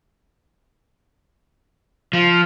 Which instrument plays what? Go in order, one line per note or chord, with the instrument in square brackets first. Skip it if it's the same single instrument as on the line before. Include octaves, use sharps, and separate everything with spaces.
[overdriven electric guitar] F3